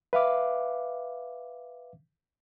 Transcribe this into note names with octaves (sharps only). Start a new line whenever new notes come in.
B4 E5 F5 D6